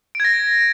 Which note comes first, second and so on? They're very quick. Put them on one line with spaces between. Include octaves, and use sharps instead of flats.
D7 G#6 A#6